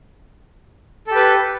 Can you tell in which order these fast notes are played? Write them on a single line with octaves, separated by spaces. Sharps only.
A4 G4 B4